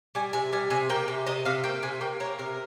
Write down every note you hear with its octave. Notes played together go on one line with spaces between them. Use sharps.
G3 G#5
C3 G#5
G3 G#5
C3 G#5
A#3 G5
C3
C3 D#5
C3 F5
A#3 G5
C3 G#5
A#3 G5
A#3 C#5
C3 A#4